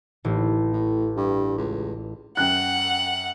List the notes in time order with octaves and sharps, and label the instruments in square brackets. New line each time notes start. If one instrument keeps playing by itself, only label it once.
[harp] A1 [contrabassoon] D#2
[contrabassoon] A2
G2
C#2
[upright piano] F#2 G5 F#6 [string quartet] F#5